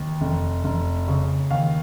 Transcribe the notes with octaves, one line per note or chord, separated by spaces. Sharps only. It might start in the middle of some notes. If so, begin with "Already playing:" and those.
Already playing: D#2
F1
F1
C#3
D#2 F5